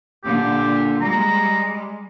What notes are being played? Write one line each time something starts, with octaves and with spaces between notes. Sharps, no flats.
A#2 D3 G4
G3 G#3 A#5